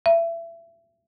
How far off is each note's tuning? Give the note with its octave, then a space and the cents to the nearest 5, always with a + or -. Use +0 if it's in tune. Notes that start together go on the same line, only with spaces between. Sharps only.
E5 +25